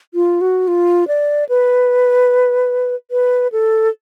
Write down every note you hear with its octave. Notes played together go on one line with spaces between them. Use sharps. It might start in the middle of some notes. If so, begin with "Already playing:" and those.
F4
F#4
F4
D5
B4
B4
A4